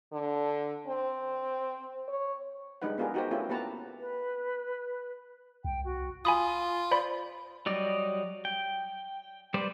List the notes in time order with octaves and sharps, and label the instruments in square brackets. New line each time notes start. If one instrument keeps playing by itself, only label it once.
[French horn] D3
C4
C#5
[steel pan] G3 G#3 D4 D#4 B4 F#5
B3 D4 F4 G4 G#4 A#4
D#4 F#4 G4 A#4 C5
A3 C#4 E4 F4 G4 B4
A#3 B3 G4 B4 A5 A#5
[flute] B4
[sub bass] C2 [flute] G5
[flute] F#4
[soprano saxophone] F4 [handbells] G#5 B5 D#6
[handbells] C5 D5 B5
[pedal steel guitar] F#3 G3 D5 D#5
G5
G3 B4 C5 D5